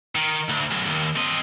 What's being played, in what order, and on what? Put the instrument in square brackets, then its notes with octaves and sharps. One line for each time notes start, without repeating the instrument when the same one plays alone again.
[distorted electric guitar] D#3
D2
B1 F#2
D#2
C4 D#5